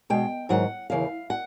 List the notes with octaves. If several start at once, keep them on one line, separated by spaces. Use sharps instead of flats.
B2 G#3 G5
G#2 D#3 F#3 F#5
D#2 C#3 E3 F5
F#5